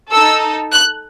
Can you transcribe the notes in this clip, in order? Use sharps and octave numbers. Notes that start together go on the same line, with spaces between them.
D#4 A4 E6
F#6